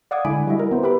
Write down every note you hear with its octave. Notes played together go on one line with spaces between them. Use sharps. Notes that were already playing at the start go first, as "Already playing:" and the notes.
D5 F5 F#5 D6 D#6 G#6
D3 G#3 E4 G#5 B5 D7
G3 E4 F#4 D#5 E5
E4 A#4 A#5
B3 C5
G4 A#4 B4 E5 B5 D6